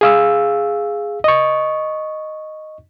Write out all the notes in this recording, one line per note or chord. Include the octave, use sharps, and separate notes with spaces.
G#4 F5 E6
D#5 C#6